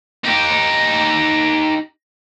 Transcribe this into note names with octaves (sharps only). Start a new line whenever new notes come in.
D#4 G4